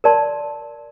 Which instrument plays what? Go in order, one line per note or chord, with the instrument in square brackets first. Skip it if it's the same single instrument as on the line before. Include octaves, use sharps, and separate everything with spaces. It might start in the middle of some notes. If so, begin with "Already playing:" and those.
[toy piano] A#4 D5 A5 C6